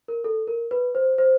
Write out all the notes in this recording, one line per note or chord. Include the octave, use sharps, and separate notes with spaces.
A#4
A4
A#4
B4
C5
C5